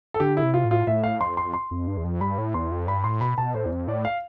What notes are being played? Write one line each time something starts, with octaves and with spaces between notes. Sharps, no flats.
A4
D3 G4
E4
C3
F4
A2
F4
A2 E5
F5
F2 C6
C6
C6
F2
G2
E2
F2
G2 B5
A2
E2 C6
F2
G2 B5
A2 C6
B2 B5
B2 A5
A2 C5
E2
F2
A2 D5
F5